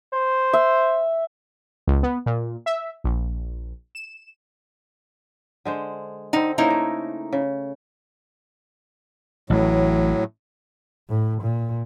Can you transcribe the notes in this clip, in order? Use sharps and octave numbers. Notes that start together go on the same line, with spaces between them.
C5
E5
C#2
B3
A#2
E5
A#1
E7
D3 G#3 C5
D3 C4 D#4
C#3 A#3 D#4 E4 A#4 C5
A3
C#3
A1 A2 F#3
A2
A#2